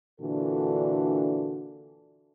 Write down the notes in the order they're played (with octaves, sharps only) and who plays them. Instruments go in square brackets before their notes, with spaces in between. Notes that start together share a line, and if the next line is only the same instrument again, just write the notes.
[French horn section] A#2 D3 E3 D4 F#4 A4